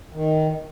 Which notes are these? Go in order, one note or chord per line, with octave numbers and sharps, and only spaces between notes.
D#3